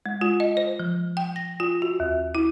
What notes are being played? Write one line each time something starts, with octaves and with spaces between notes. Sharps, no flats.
G#3
F4
D#5
C5
F3
G5
A#6
F4
F#4
D#2
E4